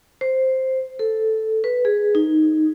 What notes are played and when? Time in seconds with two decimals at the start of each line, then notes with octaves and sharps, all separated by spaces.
0.21 C5
0.99 A4
1.64 B4
1.85 G#4
2.15 D#4